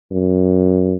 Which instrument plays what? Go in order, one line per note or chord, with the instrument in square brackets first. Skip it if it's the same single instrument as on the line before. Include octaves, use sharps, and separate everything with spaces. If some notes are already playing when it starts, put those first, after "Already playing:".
[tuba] F#2